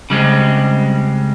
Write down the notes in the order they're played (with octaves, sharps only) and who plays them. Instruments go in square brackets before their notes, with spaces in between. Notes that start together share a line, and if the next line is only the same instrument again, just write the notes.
[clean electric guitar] C#3 G3 G#3 C4